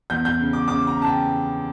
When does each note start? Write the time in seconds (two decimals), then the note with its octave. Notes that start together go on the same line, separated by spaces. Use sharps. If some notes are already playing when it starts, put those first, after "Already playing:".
0.10 E2 G6
0.25 G6
0.39 C#3
0.53 D6
0.68 C#3 D6
0.87 A#5
0.98 C#3 A5
1.07 G5